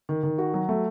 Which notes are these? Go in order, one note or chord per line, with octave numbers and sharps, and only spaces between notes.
D#3
D#3
F#4
F#3
A3